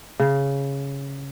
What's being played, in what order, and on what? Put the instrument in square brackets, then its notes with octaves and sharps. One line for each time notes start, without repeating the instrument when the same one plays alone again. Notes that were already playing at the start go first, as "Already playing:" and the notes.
[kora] C#3